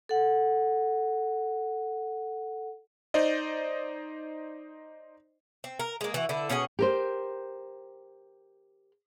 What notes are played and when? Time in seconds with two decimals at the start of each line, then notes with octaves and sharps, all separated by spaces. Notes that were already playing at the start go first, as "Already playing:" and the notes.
0.09 A4 F#5
3.14 D#4 C5 D5 D#5
5.64 C4
5.79 A#4
6.01 G#3 A#3
6.14 E3 F#4
6.29 D3 E4
6.49 B2 C#4 G#4 F#5
6.79 G4 A#4 C5